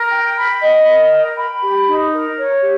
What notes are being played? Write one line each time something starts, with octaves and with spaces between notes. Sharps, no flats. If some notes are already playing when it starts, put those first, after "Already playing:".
Already playing: A#4
G5
B5
D#5
A#4
G5
B5
G4
D#4
A#4
C#5
G4